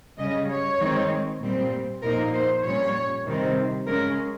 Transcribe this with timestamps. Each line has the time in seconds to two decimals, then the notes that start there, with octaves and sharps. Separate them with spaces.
0.18 C#3 G3 C#4 D#5
0.49 C#5
0.79 D#3 G#3 C4 D#4
1.41 A#2 G3 C4
2.02 A#2 F3 A#3 D#4 A#4
2.33 C5
2.64 A#2 G3 C#4 C#5
3.25 C3 D#3 G3 C4 D#4
3.87 C#3 G#3 C#4 A#4